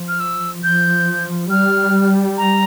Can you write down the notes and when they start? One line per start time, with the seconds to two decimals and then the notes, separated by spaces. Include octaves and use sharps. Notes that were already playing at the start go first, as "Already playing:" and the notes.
Already playing: F3
0.08 F6
0.20 E6
0.63 F3 G6
1.50 G3 F6
2.37 A#5